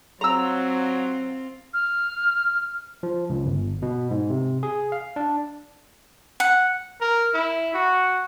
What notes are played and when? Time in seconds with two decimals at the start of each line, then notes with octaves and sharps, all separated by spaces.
0.21 F#3 C4 F4 A#5 E6
1.74 F6
3.03 F3
3.30 C#2
3.46 G1
3.82 B2
4.11 G#2
4.30 C3
4.63 G#4
4.92 F5
5.16 D4
6.40 F#5
7.01 A#4
7.34 E4
7.74 F#4